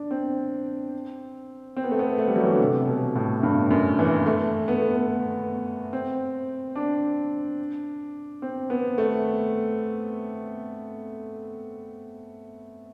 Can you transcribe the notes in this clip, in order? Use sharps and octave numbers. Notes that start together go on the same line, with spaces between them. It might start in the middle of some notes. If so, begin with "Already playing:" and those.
Already playing: D4
C4
C4
B3
A3
B3
A3
G3
F#3
E3
D3
C3
B2
A2
G2
F#2
E3
A3
B3
A3
B3
C4
D4
C4
B3
A3